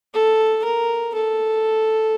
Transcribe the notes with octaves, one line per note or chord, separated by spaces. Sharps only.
A4
A#4
A4